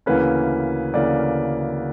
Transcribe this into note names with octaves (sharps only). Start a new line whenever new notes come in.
D2 C#3 E3 A#3 C#4 B4
D2 C#3 E3 A#3 C#4 D5